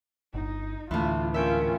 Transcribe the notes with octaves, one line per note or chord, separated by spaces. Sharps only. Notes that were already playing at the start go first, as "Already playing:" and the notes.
G1 D#4
D2 A2 E3 F4
G#2 C#4 F4 A#4 E5 G5